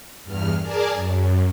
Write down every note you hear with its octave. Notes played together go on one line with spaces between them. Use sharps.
E2 G2 F6
G#4 A#4 D5 G#5 A5
F#2